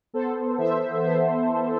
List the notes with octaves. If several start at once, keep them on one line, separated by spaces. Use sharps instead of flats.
B3 A4 C5
E3 C5 E5
B3 C5 E5
E3